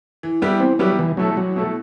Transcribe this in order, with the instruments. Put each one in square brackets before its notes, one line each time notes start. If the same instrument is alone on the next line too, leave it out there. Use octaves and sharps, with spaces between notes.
[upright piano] E3
G3 B3 E4 G4
[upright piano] E3 [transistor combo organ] C4
[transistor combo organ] F#3 [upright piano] G3 B3 E4 G4
[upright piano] E2 [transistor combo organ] E3
[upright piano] B2 A3 E4 A4 [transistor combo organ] F#3
[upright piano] E2 [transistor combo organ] F#3
[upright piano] B2 A3 E4 A4